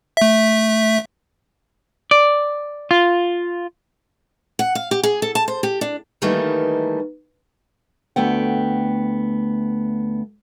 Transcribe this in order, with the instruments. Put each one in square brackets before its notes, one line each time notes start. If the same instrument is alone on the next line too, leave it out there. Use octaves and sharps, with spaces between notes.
[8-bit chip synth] A3 E5
[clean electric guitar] D5
F4
[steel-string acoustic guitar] F#5
F5
G4
G#4
A4
A5
C5
G4
D4
D#3 E3 G3 A3 A#3 D#4
D2 A3 B3 G5